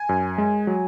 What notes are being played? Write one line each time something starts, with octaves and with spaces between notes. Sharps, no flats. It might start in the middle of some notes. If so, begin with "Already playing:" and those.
Already playing: G#5
F#2
G#3
F#3